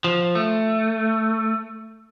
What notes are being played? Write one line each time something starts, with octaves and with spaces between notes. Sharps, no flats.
F3
A3